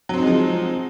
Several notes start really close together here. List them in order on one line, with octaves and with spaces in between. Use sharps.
F#3 C4 D#4 G#3 F3